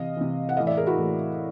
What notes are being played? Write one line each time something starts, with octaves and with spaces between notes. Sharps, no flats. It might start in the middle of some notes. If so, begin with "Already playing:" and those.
Already playing: C3 E3 D#5 F5
C3 E3
F#5
A2 E3 D#5 F5
D5 E5
G#4 A#4
E4 F#4
A2 E3